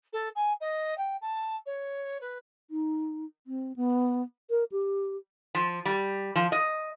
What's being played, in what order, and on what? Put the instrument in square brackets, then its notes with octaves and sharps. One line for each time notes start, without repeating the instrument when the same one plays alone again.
[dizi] A4
G#5
D#5
G5
A5
C#5
B4
[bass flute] D#4
C4
B3
A#4
G4
[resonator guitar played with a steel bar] F3
G3
F3
D#5